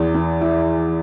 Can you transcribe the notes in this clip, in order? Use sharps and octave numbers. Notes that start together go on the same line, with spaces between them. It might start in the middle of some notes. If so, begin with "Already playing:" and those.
Already playing: E2 E3
E3
E4